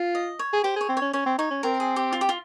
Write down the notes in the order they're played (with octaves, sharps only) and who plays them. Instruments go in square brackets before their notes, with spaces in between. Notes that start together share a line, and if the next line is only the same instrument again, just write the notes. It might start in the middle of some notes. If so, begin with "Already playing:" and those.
Already playing: [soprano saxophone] F4
[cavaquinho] D#5
C#5
[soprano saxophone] G#4
[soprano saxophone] G4 [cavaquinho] C5
[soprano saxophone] G#4
[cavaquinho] C#5
[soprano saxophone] C4
[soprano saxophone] C#4 [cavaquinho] C#5
[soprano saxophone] C#4 [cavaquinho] C#5
[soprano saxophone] C4
[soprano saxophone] D#4 [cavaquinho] C#5
[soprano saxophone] C#4
[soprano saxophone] C4 [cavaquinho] A#4
[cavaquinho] G#4
G4
F4
G4
F4